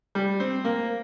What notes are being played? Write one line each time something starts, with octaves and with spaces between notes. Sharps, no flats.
G3
C4
A#3